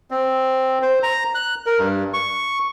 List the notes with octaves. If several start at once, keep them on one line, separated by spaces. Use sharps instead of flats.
C4
C5
A#5
F#6
A#4
G2
C#6